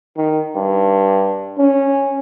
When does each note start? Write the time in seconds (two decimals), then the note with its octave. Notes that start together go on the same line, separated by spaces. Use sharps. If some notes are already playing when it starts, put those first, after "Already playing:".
0.17 D#3
0.55 G2
1.58 C#4